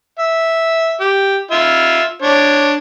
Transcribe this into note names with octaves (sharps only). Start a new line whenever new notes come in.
E5
G4
F4 E5
D4 C#5